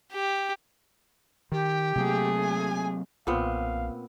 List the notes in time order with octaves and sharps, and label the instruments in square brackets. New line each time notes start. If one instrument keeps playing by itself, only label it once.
[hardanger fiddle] G4
[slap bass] D#3 [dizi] G4
[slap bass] C3 F#3 A#3 [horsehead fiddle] A3 G#4
[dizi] G#5
[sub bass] B1 [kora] A#2 B3 C4 [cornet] F5